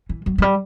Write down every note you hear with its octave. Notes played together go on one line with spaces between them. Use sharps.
E3
F#3
F#3
G3